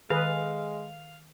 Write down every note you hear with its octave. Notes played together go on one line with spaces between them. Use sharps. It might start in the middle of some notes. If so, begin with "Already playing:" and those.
D#3 G#3 G#4 A4 B4 F5